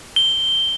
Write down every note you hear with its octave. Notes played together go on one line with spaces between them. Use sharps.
G7